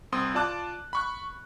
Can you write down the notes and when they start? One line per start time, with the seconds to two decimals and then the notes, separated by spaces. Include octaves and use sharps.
0.12 C2 C4 C6 D#6
0.34 F4 D5 A5 D6 F#6
0.93 B5 C#6 F#6